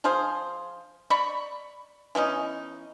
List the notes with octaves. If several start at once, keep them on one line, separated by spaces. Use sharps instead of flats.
F3 F4 G#4 C5
D5 A#5 B5 C#6
E3 B3 C#4 D#4